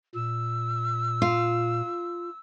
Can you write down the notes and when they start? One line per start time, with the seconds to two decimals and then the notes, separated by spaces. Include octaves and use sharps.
0.15 A#2 E6
1.22 F4